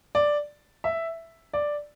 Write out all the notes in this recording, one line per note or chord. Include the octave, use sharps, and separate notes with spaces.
D5
E5
D5